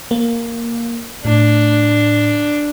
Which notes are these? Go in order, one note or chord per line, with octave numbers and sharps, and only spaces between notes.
A#3
A2 D4